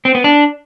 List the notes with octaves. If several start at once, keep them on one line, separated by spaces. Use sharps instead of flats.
C4
B3
D4